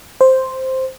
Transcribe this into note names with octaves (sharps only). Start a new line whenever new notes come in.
C5